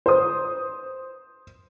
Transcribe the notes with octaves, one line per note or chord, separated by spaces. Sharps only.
C5 D#6